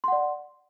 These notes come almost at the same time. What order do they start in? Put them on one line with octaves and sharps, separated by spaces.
C6 F#5 D5